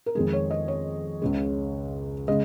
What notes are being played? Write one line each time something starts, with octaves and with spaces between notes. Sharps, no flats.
A#4
F2 D#3 G#3 G#4
C#5
D#5
C#5
C#2 C#3 G#3
C#3 G#3 D#5